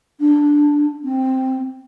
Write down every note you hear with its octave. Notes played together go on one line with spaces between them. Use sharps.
D4
C4